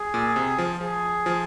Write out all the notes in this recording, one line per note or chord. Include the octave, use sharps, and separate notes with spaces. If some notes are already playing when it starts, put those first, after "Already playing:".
Already playing: G#4
A#2
C3
F3
F3 G#4
F3